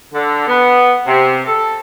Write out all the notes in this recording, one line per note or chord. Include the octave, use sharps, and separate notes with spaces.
D3
B3
C3
A4